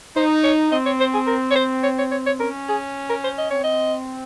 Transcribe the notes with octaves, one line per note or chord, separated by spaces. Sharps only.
D#4 C5
C#5
C4 D#5
C#5
C5
G#4
A#4
C#5
C5
C#5
C#5
C#5
C#5
C#4 A#4
G#4
A#4
C5
D#5
C4 C#5
D#5